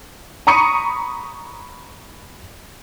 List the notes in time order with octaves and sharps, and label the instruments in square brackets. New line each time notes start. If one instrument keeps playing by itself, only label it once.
[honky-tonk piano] A#5 B5 C#6 D#6 C#7 D#7